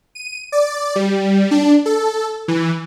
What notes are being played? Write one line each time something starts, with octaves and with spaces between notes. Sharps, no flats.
D#7
D5
G3
D4
A4
E3